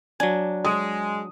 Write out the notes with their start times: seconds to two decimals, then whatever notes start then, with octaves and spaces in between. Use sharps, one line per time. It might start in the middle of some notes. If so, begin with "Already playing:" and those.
0.20 F#3 D4 G#5
0.65 G#3 D#6